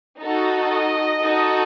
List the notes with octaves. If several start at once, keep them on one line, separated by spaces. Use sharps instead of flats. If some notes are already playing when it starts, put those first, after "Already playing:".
D#4 F#4 A4
D#5
D#4 F#4 A4